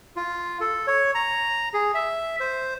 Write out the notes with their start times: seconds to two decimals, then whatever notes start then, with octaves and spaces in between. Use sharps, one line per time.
0.16 F4
0.61 A4
0.87 C#5
1.15 A#5
1.74 G#4
1.94 E5
2.40 C5